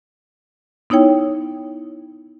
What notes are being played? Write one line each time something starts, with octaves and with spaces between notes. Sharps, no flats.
B3 D#4 E4 C#5 G5